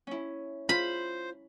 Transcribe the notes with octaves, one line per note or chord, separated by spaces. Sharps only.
C#4 E4
F4 C5 B5